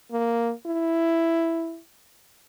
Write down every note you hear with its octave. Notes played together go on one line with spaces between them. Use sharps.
A#3
E4